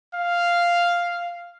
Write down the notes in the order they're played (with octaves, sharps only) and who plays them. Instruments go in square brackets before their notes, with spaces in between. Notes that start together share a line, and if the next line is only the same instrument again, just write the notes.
[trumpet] F5